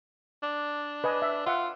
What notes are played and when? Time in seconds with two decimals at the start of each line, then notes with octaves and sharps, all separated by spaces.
0.43 D4
1.04 B4 D#5 G#5
1.22 E5
1.46 F4 E5 F#5